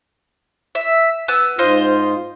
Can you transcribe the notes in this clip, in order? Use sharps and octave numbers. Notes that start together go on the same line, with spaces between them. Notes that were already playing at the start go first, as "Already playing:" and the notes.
E5
B3 E6
G#2 F4 C5 D#5 F5